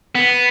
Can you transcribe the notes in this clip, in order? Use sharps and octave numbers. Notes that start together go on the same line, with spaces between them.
B3